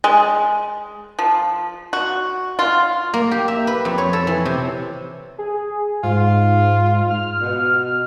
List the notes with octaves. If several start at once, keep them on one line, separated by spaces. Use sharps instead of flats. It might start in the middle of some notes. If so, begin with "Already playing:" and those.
G#3
F3
F#4
F4
A#3
G4
E5
B4
F2
C#5
A4
E3
C3
G#4
G#2 F4
F6
B2